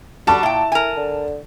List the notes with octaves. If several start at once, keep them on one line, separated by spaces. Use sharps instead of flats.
D3 G3 F#4 A5
A#2 E4 G5
A#4 G#5
D3